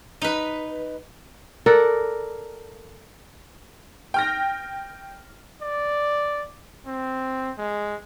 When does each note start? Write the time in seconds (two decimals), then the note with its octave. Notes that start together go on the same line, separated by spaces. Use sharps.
0.22 D#4 B4
1.66 A4 A#4 D5 F#5
4.14 G5 F6 A#6
5.62 D5
6.86 C4
7.58 G#3